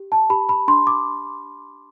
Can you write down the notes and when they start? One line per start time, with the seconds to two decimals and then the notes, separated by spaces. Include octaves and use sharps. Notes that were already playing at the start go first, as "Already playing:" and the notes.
Already playing: G4
0.12 A5
0.30 G4 B5
0.49 B5
0.68 D4 C6
0.87 D6